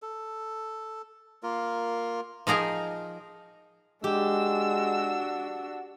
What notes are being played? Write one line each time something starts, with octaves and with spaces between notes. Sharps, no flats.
A4
A#3 F4 A#4
F3 D#4 G#4 A#4
G#3 D4 F#4 G4 E6